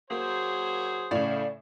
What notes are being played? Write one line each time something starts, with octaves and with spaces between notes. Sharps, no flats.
F#3 A#3 G#4 C5
A2 C#3 D5 F5